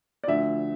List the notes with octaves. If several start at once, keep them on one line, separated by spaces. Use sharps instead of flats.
D5
D2 D3 F3 E5